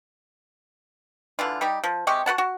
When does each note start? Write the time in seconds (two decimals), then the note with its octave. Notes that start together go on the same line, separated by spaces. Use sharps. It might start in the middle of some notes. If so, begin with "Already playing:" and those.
1.39 D3 E3 F4
1.61 G3 D#4 G4
1.84 F3
2.07 C3 G#3 G4 C#6
2.26 F#4 B4 F#5 A5
2.38 F#4